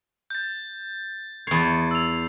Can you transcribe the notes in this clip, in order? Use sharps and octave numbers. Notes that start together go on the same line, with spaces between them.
G6 A6
E2 C#5 C7
E6 F7